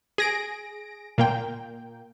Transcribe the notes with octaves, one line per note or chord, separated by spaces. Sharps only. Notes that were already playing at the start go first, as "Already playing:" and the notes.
G#4 A#6 D7
A#2 A#3 G5